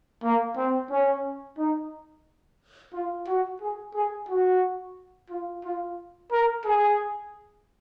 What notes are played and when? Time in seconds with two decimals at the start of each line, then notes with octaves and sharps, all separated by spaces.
0.23 A#3
0.56 C4
0.90 C#4
1.58 D#4
2.93 F4
3.27 F#4
3.61 G#4
3.94 G#4
4.29 F#4
5.30 F4
5.64 F4
6.32 A#4
6.65 G#4